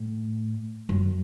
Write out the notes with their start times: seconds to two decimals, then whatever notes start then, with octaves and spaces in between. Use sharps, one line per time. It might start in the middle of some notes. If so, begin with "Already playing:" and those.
Already playing: A2
0.89 F#2